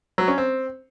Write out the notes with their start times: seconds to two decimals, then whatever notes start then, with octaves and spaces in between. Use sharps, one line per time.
0.18 F#3
0.28 C#4
0.38 C4